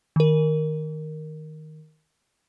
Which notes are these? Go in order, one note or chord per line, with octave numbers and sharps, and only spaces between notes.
D#3 A#4